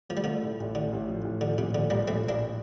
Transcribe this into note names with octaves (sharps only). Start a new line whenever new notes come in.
F3 A3
G3
D3 F3 A3
A2
A1
A2 D3
A1
F3
A1
D3 F3
A#1 C3
A#1 D3
F3 G3 A#3
A#1 A3 C4
A#1
A#3 D4